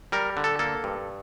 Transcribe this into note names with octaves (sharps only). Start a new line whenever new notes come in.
G3 A#4
D3
A4
A#3 A4
G2